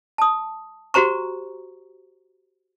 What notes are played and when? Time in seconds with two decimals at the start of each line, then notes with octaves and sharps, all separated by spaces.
0.18 A5 D#6
0.94 F#4 G4 C5 A#5 C#6